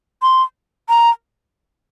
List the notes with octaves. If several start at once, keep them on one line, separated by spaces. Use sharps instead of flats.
C6
A#5